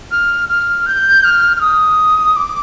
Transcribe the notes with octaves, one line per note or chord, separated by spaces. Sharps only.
F6
F6
G6
F6
F6
D#6
D6